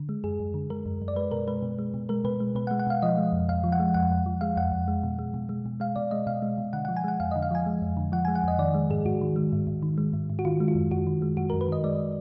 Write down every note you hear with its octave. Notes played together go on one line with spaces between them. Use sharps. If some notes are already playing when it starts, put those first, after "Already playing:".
Already playing: D3
G#3
F#2 G#4
F#2
D3
G#3 A#4
F#2
F#2
D5
G#3 B4
B2 A#4
G#3 B4
B2
G#3
B2
G#3 A#4
B2 B4
G#3
B2 B4
F#5
G#3
F#5
B2 F5
F3 D#5
G#3
F2
F2 F5
F3
F#5
G#3
F2 F#5
F2
F3
G#3 F5
F2 F#5
F2
G#3
B2
G#3
B2
G#3
B2
G#3 F5
B2 D5
G#3 D#5
B2 F5
G#3
B2
D3 F#5
F3 F#5
G#5
G#3 F#5
F2 F5
D3 D#5
F5
F3 G#5
G#3
F2
D3
F3 F#5
G#3 G#5
F#5
F2 D#5
D#3 D5
G#3
G#2 G#4
G#2 F#4
D#3
G#3
G#2
G#2
D#3
G#3
G#2
G#2
F#4
D#3 F4
G#3
F4
F#2
F#2 F#4
D#3
G#3
F#2 F#4
F#2 A#4
B4
D#3 D#5
G#3 D5